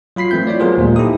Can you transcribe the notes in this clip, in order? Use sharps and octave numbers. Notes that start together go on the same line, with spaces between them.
F#3 F4 B5 B6 C7
E3 A3 C4 G6
E4 F4 C#5 D5
F#3 B3 F4 G#4 A#4 C5
D#2 A#2 G3 G#3
D#4 E4 G4 A4 D#6